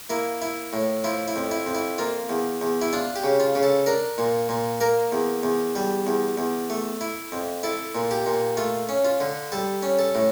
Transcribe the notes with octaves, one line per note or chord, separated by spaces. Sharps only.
A#3 E4
E4
A2
F3 E4
E4
F2
E4
F2
E4
A#3 F4
E2
E2
E4
D4 F4
G4
C#3
F4
C#3
A4
D4 A#4
A#2
A#2
A#3 A#4
E2
E2
G3
E2
E2
A3
E4
F2
E4 A4
A#2
G4
A#2
A3 F4
C#4
F4
D3
G3 A4
C#4
A4
A2